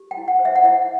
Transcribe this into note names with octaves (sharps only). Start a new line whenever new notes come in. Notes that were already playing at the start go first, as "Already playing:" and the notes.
Already playing: G4
G5
E4
F#5
C5
E5
F#5
E4 E5